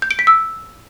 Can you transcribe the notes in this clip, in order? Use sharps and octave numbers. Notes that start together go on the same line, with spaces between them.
G6
D7
B6
E6